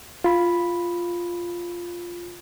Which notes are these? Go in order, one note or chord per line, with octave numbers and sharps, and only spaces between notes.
F4 B5